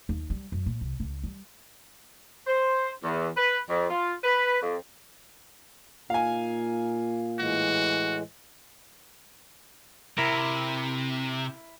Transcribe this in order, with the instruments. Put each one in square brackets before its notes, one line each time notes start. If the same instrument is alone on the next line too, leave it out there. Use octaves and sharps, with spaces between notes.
[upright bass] D#2
G3
F#2
A#2
C2
C#2
G3
[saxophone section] C5
E2
B4
F2
F4
B4
F2
[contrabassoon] A#2 [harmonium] D#4 [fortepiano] F5 G#5
[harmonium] A2 E3 G#3 [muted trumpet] F#4
[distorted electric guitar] C3 [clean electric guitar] E4 A#4